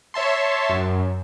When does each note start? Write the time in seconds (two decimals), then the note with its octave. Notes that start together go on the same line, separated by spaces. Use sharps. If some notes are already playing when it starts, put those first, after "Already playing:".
0.14 C#5 E5 A5 C6
0.69 F#2